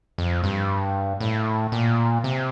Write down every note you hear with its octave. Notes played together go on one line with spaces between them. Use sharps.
F2
G2
A2
A#2
C3